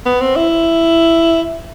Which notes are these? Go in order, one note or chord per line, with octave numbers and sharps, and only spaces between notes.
B3
C4
E4